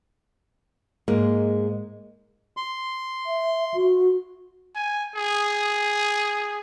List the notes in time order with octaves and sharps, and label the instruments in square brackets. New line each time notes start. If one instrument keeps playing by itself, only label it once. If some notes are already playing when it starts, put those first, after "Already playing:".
[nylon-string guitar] G#2 G#3 A#3
[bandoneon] C6
[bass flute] E5
F#4
[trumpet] G#5
G#4